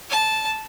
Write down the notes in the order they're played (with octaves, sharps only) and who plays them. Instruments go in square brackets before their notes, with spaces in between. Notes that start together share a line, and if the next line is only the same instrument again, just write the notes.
[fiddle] A5